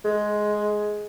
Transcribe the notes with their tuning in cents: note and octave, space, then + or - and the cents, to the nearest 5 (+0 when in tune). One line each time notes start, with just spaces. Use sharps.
G#3 +10